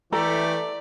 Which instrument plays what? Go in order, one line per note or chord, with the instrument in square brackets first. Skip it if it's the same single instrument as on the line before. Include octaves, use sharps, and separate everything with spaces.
[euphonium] E3 [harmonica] A3 G4 [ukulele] A4 A#5 [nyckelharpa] D5